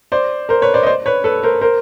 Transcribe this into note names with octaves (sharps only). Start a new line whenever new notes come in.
C5 D5
A#4 C5
B4 C#5
C5 D5
D#5
C5 D5
B4 C#5
A4 B4
A#4 C5
A#4 C5